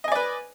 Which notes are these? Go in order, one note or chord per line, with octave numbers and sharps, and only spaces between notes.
B4 D5 D#5 G#5